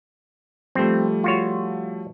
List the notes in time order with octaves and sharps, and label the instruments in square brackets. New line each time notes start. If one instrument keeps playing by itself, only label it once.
[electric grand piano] F3 G3 A3 [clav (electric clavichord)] C4
[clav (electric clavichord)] F4 F#4 C#5